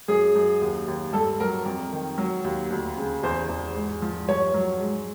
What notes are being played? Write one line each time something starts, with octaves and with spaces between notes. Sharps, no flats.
F#2 G#4
F#2
D#2
D#2
G2 A4
F#3 A#4
F2
D#3
F#3
D#2
D2
C#3
E2 C5
E2
G#2
F3
G2 C#5
F#3
G#2